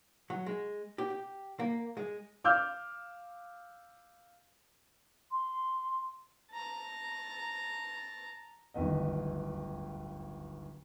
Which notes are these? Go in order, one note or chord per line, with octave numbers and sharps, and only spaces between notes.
F#3
G#3
G4
G4
A#3
G#3
F5 D6 E6 F6 G6
C6
A5 A#5
D1 G1 D#2 B3 D#5